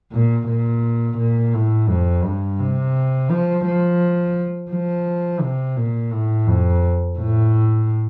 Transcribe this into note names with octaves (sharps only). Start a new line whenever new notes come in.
A#2
A#2
A#2
A2
F2
G2
C3
F3
F3
F3
C3
A#2
A2
F2
A2